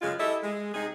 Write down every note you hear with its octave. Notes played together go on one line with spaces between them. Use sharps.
F#2 C#3 G#3 F4
E4 G4 A4 D#5 E5
G#3
C3 D#4 G#4